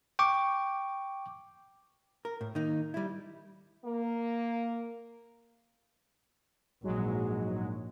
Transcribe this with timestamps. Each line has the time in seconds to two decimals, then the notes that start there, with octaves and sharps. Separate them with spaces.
0.19 G5 C#6 D6
2.25 A#4
2.41 A2
2.55 D#3 A#3 D#4
2.94 G3 E4
3.84 A#3
6.83 A#1 G#2 F#3 G#3